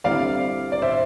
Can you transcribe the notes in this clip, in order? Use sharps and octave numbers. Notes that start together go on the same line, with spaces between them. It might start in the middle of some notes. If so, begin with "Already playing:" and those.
D3 G3 C4 E4 D5 F5
D5
C5 E5